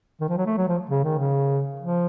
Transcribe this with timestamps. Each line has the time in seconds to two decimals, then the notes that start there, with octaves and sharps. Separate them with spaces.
0.21 D#3
0.29 F3
0.38 F#3
0.46 A3
0.57 F#3
0.68 F3
0.90 C#3
1.04 D#3
1.18 C#3
1.80 F3